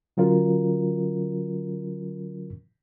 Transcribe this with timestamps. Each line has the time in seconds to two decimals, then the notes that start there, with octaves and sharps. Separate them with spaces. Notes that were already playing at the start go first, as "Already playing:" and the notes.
0.17 D3 F#3 C#4 F4 A#4